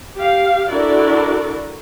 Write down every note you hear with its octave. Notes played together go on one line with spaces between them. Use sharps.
G4 F5
D4 E4 F#4 A4 A#4 D5